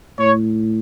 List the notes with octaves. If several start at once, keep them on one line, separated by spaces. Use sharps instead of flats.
A2 C#5